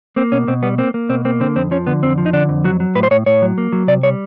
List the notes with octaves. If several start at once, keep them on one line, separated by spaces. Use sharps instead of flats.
A#3 C4
B2 C#4
B2 C4
G3 B3
A#3 C4
A#3
B2 C4
A#3 C4
D3 C4
F2 C4
F3 C#4
D3 B3
F2 C4
F3
D#4
D3 D4
F2
F#3 F#4
F#3
A2 B4
C5
A2 C#5
A2 C#5
F#3
A#3
F#3
C3 D5
G3 C#5